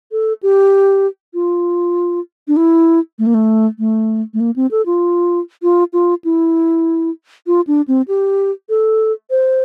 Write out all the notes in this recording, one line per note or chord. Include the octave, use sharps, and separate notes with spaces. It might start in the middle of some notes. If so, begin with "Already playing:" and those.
A4
G4
F4
D4
E4
A3
A#3
A3
A3
A3
A#3
C4
A4
F4
F4
F4
E4
F4
D4
C4
G4
A4
C5